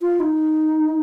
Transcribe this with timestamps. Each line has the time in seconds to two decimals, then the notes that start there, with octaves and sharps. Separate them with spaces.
0.02 F4
0.20 D#4